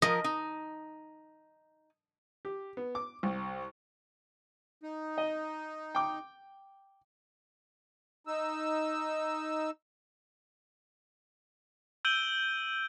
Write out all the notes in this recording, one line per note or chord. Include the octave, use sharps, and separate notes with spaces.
F3 A#4 D#5
D#4
G4
B3
D6
C2
D#4
D#5
G5 D6
D#4 E6
E6 G6 D7 D#7 F#7 G7